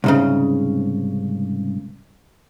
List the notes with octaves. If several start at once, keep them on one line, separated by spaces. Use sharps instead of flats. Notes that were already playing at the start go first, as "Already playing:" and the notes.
C2 G#2 C#3